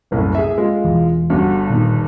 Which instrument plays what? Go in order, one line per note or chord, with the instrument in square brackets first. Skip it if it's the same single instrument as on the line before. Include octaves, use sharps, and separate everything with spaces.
[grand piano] F#1 C2 A2
G#4 E5
[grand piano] G#3 [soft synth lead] F4
[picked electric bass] E1 E2 E3
[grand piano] G1 G2 [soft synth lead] F#4
[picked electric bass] A#2 B3 [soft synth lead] D#3